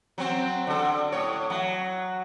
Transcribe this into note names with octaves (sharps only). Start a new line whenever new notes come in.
F#3 C4
D3 A4
A2 C#5
F#3